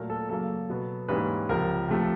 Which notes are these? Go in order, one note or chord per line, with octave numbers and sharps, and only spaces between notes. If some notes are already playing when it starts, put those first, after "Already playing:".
Already playing: A#2 F#3 A3 A#4
A4
F#2 C#3 F#3 A#3 A4
B2 F#3 B3
G#2 E3 G3 A#3 C#4 B4
C#2 C3 F3 A#4
C3 F3 A3